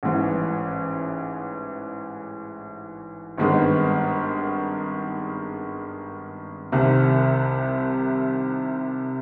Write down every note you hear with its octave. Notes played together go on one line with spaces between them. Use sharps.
A1 G#2 E3
G#1 G2 D#3 G#3 B3
C2 C3 D#3